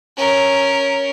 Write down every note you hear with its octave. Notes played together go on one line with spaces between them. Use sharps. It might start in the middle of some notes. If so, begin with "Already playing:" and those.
C#4 A#4